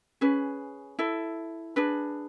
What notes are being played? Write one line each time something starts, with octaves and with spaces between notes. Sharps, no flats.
C#4 G#4 B4
E4 A4
D4 G#4 B4